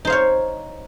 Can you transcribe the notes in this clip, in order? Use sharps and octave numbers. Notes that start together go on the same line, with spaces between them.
D#4 C5 C#5 F5